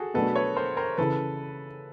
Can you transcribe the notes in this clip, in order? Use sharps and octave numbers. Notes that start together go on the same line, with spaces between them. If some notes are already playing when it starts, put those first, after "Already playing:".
Already playing: F#4 G#4 A4
B2 F#3 A3 D4 A4 B4
B4 C#5
A#4 C5
A#4 C5
C#3 E3 A4 B4